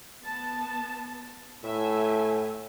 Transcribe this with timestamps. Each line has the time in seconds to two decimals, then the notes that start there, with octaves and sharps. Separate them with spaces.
0.24 B3 A5
1.64 A2 E5 G#5